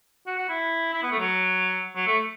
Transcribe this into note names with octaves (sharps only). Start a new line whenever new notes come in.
F#4
F#4
E4
E4
B3
A3
F#3
F#3
A3